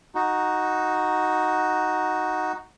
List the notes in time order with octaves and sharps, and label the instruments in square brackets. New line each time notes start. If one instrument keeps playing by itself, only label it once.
[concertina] D#4 F#4